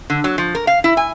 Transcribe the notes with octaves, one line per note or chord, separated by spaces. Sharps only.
D3
F#3
F3
A#4
F5
E4
G#5